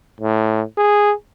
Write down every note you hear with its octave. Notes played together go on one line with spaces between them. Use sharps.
A2
G#4